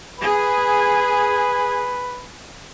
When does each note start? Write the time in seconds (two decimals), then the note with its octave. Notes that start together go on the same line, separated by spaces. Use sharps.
0.20 G#4 B4